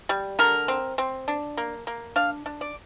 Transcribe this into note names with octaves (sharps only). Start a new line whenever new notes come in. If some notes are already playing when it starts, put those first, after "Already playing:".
G3
D3 A#4
C4
C4
D4
A#3
A#3
D4 F5
D4
D5